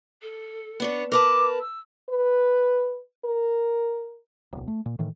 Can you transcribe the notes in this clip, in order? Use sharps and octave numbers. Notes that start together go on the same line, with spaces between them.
A4
B3 D4 C#5
A#4 B4 A5 D6
E6
B4
A#4
D1 B1
A3
A#2
A2 D#3 E3